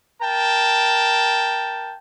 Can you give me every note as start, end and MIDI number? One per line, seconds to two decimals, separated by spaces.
0.22 1.96 70
0.22 1.96 79
0.22 1.96 81